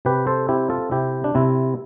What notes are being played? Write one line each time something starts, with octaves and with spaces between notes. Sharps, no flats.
C3 G4 B4
A4 C5
C4 E4 G4
F4 A4
C3 E4 G4
D4
C3 C4 E4